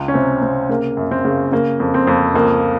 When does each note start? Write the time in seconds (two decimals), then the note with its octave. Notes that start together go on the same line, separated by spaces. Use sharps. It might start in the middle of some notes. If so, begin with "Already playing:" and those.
Already playing: C#2
0.08 C#4
0.14 C3 C4
0.42 C3 C4
0.69 C#3 A#3
0.97 F#2
1.11 C4
1.25 C#3
1.52 C#3 A#3
1.80 F2
1.94 C4
2.07 F2
2.34 C#2 A#3